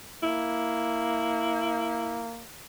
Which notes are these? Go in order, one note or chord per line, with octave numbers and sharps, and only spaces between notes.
A#3 E4